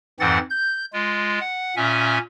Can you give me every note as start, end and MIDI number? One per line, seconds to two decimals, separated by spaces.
0.20 0.38 41
0.20 0.38 44
0.20 0.38 52
0.20 0.38 60
0.20 0.38 78
0.20 0.38 93
0.50 0.85 91
0.93 1.39 56
0.93 1.39 65
1.40 1.75 78
1.77 2.19 46
1.77 2.19 61
1.77 2.19 76
1.77 2.19 80